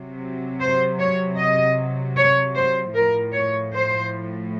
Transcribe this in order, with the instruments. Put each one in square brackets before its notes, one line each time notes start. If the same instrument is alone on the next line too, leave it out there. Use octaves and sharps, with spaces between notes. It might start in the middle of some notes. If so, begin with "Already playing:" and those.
Already playing: [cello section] C3 F#3
C5
C#5
D#5
C#5
C5
A2 F3 A#4
C#5
C5